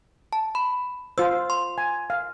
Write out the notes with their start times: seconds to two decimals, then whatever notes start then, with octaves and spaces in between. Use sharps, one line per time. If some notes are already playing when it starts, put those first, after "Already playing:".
0.33 A5
0.55 B5
1.18 F4 C5 E6
1.50 C6
1.78 G#5
2.10 F5